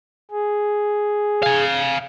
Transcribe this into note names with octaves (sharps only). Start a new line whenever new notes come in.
G#4
F5 G#5